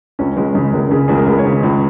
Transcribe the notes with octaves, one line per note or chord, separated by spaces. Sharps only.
C#2 C#4
C#2 G#3
C#3 G#3
C#2 A#3
C#3 G#4
C#2 G#4
A#4
C#2
C#5
C#3
C#2